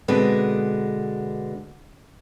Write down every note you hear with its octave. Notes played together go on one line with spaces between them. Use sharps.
B2 D3 G#3 C4 B4